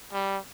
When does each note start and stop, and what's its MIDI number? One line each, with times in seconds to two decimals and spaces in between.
0.13 0.38 55